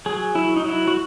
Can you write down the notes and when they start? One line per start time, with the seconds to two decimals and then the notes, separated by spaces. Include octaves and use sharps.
0.06 F#3 G#4
0.35 F#3 E4
0.56 D#4
0.65 F#3 E4
0.87 F#4